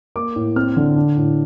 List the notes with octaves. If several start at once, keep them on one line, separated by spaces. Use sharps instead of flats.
A#3 D6
A2
C4 F6
D3
D4
A2